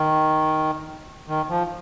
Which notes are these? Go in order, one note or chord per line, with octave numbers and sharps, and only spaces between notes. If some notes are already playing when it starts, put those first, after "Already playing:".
Already playing: D#3
D#3
F3